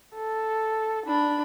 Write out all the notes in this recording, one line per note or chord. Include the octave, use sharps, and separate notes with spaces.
A4
D4 B5